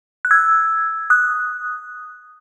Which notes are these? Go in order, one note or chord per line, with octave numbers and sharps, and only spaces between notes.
F#6
E6 G#6
D#6 F#6